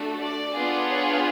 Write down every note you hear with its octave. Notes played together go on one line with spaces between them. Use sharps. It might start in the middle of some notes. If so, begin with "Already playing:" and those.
Already playing: A3 D4 F#4 A4
D5
B3 D4 F4 G#4
C#5